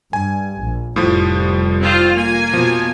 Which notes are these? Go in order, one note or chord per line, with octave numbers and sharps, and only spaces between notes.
G2 G#5
A#1
F1 A2 F3 G3
C4 F4 C5
A#3 G#5
B2 F3